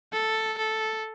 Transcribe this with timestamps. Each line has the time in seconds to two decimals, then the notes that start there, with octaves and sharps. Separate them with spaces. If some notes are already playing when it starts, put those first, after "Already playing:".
0.13 A4
0.58 A4